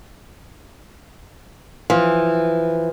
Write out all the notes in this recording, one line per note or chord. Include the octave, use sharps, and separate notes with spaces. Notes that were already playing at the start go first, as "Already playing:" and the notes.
E3 F3